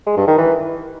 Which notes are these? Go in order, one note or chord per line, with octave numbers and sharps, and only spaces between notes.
G#3
G2
D#3
E3